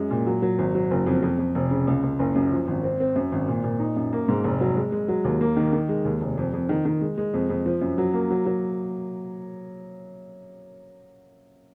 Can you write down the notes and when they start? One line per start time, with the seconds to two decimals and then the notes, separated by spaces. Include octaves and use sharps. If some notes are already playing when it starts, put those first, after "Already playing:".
Already playing: F#2 G#3
0.11 A#2
0.27 F#3
0.42 F#3
0.59 G#1
0.75 F#3
0.91 F#1
1.06 F2
1.22 F2
1.39 F2
1.55 F1
1.71 C#3
1.87 C#2
2.03 C#2
2.19 F#1
2.35 F#2
2.51 F3
2.68 G#1
2.83 C4
3.00 C4
3.16 F#2
3.32 G#1
3.48 A#2
3.64 A#2
3.80 D#4
3.96 F#2
4.13 A#3
4.28 G#2
4.44 F1
4.61 F#3
4.76 G#3
4.92 G#3
5.08 F#3
5.24 D#2
5.41 A#3
5.57 D#3
5.73 D#3
5.89 G#3
6.05 D#2
6.21 F1
6.37 F2
6.53 F2
6.69 D#3
6.85 D#3
7.01 G#3
7.18 G#3
7.34 F2
7.50 F2
7.66 F3
7.81 F#2
7.98 F#3
8.14 A#3
8.30 F#3
8.46 F#3